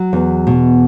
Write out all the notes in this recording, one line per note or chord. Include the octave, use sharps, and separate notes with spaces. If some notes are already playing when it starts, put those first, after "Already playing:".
Already playing: F#3
E2
B2